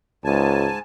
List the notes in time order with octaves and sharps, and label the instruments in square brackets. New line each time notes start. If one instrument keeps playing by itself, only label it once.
[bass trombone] C#2 [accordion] G#2 G#5 A5